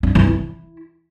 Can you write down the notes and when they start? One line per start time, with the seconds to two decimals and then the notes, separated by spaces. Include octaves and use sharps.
0.03 D4
0.15 E3
0.27 E4